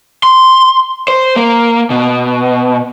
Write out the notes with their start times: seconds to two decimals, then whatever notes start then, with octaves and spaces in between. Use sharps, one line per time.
0.23 C6
1.08 C5
1.36 A#3
1.90 B2